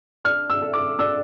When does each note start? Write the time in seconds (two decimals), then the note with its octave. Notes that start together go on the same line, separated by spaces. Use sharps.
0.24 D4 F6
0.50 E6
0.62 A4 E5
0.73 D6
0.99 D4 E6